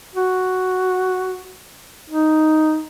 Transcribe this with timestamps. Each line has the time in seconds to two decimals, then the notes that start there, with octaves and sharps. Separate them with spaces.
0.15 F#4
2.10 D#4